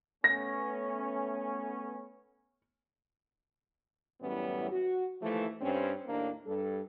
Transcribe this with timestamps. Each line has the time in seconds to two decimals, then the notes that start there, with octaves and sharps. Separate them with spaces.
0.24 A3 B3 C#4 A#6
4.21 F#2 A2 E3 G3 B3 C#4
4.71 F#4
5.21 D#2 E3 F3 A3
5.60 G2 C4 C#4
6.07 D#2 A2 A#3 D4
6.46 G2 G3 A4